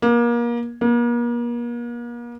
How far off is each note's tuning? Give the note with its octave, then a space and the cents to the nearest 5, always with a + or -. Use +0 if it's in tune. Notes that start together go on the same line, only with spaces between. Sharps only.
A#3 +30
A#3 +40